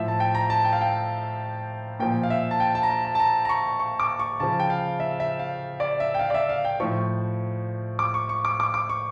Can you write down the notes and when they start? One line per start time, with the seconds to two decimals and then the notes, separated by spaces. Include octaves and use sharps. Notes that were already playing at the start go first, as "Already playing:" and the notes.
Already playing: A2 F3 E5
0.08 A5
0.20 G5
0.35 A#5
0.50 A5
0.65 G5
0.73 F5
0.81 G5
2.00 A#2 F3 G5
2.23 F5
2.30 E5
2.51 A5
2.60 G5
2.75 A5
2.83 A#5
2.90 A5
3.05 A5
3.15 A5
3.20 A#5
3.45 A#5
3.49 C#6
3.79 C#6
4.00 D6
4.19 C#6
4.40 C#3 F3 A5
4.60 G5
4.70 F5
5.00 E5
5.20 E5
5.39 F5
5.80 D5
6.00 E5
6.14 G5
6.19 F5
6.30 D5
6.34 E5
6.49 F5
6.65 G5
6.80 A2 F3 C#6
7.99 D6
8.14 C#6
8.29 C#6
8.45 D6
8.60 D6
8.74 D6
8.89 C#6